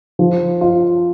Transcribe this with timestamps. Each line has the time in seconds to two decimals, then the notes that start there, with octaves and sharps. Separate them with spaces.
0.19 F3
0.61 F4